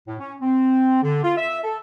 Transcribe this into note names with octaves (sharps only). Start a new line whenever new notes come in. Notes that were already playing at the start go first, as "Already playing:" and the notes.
A2
C#4
C4
D3
F4
E5
A4